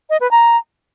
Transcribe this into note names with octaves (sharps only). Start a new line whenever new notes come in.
D#5
B4
A#5